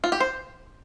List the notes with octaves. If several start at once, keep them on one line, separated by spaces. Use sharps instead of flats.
F4
G4
C5